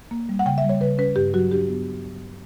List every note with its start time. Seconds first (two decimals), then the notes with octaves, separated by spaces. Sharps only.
0.11 A#3
0.29 G3
0.39 F#5
0.46 C#3 G5
0.58 E5
0.64 G3
0.69 C#5
0.81 C#3 B4
0.98 C#4 B4
1.16 G2 G4
1.34 F#3 F#4
1.51 D4 G4
1.69 B3